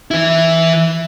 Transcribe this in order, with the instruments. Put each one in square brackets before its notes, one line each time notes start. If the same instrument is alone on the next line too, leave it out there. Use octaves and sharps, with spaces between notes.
[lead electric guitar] E3 E4